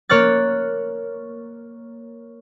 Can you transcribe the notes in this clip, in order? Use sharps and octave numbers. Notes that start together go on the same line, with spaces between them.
A#3 C#5 F6 F#6 A6